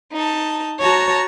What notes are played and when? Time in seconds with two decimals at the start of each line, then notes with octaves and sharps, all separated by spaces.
0.12 D#4 A5
0.81 F#4 C#5 A5 A#5